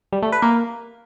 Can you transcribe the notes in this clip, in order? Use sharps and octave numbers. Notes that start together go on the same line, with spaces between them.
G3
A3
B4
A#3